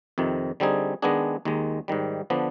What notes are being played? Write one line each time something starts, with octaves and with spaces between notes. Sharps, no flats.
F2 C3 D#3
D3 G3 C4 D#4 G#4
D#3 G#3 B3 D4 G#4
D#2 D#3 G#3
G#2 D#3 G3
D3 F3 B3 D4